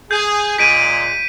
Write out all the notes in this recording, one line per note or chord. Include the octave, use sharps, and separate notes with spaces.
G#4 G6
A#2 G#3 B6 D7 D#7